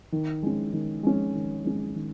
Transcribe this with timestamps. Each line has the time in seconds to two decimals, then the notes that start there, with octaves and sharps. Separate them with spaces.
0.12 D#3
0.43 G#3 C#4
0.73 D#3
1.03 G#3 C#4
1.34 D#3
1.64 G#3 C#4
1.95 D#3